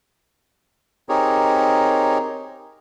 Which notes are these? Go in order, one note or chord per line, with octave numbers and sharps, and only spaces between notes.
C4 D#4 G4 G#4 A#4 C#5